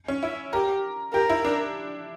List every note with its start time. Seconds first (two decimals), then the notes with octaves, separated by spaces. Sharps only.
0.08 C#4
0.23 E4 E5
0.53 G4 A#4
1.14 G4 A#4
1.30 E4
1.45 D4